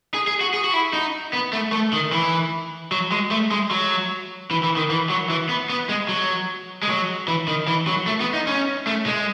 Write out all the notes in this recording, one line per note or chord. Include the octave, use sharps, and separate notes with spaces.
G#4
G#4
F#4
G#4
F#4
E4
D#4
B3
A3
A3
D#3
E3
F#3
G#3
A3
G#3
F#3
E3
E3
D#3
E3
F#3
E3
B3
B3
G#3
F#3
G#3
F#3
E3
D#3
E3
F#3
A3
B3
D#4
C#4
A3
G#3